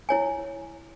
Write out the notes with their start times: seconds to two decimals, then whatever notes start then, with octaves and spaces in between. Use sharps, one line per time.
0.09 E4 C#5 G#5